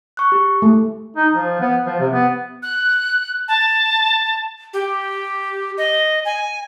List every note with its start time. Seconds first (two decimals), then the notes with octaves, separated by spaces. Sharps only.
0.17 C#6 F#6
0.32 G4
0.62 A3
1.16 D#4
1.34 F3
1.61 B3
1.86 F3
2.00 C3
2.13 B3
2.62 F#6
3.48 A5
4.73 G4
5.78 D#5
6.25 G#5